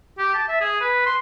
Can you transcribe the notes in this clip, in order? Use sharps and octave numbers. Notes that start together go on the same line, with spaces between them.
G4
A5
E5
G#4
B4
C6